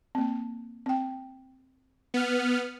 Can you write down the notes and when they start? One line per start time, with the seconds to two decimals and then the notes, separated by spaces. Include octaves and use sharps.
0.15 A#3 C4
0.86 C4 G5
2.14 B3 F6